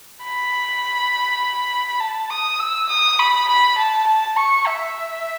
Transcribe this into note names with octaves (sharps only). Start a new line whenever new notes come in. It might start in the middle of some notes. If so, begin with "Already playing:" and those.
B5
A5
D#6
E6
D#6
B5
B5
A5
A5
C#6
E5